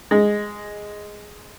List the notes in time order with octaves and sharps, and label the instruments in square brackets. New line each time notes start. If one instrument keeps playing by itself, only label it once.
[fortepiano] G#3